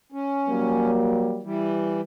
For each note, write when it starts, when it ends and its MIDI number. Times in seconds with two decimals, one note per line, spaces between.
0.12 0.91 61
0.49 1.42 54
0.49 1.42 55
0.49 1.42 58
1.43 2.01 52
1.43 2.01 55